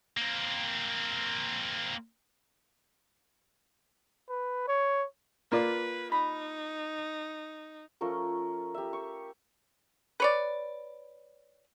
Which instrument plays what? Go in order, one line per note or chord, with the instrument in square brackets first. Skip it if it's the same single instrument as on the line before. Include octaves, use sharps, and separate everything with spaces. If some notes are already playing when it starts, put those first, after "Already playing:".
[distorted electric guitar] A#3 C4
[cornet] B4
C#5
[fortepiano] A#3 F4 D5 [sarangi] B4
[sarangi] D#4 [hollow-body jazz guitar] B5
[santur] F3 A3 C#4 A#4
G4 E5
C#6
[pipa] B4 C#5 D5